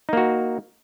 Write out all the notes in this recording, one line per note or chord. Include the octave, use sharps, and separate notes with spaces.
A#3 D#4 F#4